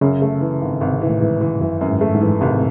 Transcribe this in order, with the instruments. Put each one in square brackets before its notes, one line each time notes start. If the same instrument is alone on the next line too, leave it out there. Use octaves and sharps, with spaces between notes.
[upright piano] F#2 [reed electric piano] C#3
[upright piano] A3
E3
G#1
[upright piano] G#1 [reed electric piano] C3
[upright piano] E3
[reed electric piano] A2
[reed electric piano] G#2 [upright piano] E3
[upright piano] E3
[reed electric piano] F#2 [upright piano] E3
[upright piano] F#2
[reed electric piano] G#2
[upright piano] A3
[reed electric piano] G#2
[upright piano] E3
[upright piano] G#1 [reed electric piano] C3
[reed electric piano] A2